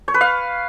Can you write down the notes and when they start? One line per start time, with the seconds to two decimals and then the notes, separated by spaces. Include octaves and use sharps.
0.08 C#5
0.14 B4
0.21 F5